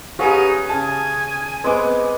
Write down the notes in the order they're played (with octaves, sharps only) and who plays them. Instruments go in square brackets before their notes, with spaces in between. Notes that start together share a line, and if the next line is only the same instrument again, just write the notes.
[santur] C#4 G#4 [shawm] D#4 [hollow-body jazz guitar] G4 F5 [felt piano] B4 F#5 A#5
[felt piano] C#3 A5 [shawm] G#5
[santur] G#3 D6 [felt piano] B3 C4 [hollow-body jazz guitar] B4